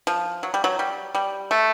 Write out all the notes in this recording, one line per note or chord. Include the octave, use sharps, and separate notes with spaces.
F3
F#3
G3
F#3
G3
G3
A3